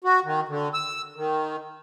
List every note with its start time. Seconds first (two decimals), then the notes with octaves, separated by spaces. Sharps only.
0.04 F#4
0.25 D#3
0.49 D3
0.74 E6
1.16 D#3